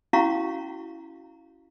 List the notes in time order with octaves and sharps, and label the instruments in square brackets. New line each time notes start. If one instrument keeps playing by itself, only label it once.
[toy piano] C#4 E4 F#4 F5 A#5 C#6